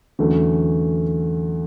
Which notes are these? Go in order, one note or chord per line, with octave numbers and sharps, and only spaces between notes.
E2 D3 F#3 A3 C#4